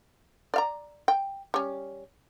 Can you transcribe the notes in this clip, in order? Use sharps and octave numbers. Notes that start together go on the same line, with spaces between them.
D5 F5 A#5
G5
G3 C#4